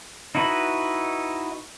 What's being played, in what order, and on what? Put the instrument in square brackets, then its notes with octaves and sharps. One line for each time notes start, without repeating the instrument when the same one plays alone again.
[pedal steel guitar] D#4 E4 F#4 B4